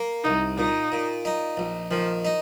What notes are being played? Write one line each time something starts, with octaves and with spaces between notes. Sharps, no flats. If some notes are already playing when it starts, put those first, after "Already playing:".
Already playing: A#3
C2 D#4
A#2 D#4
A#2
D#4
A#1
D#3 F3
D#4